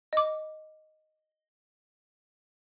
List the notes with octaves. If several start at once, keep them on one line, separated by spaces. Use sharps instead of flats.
D#5 D6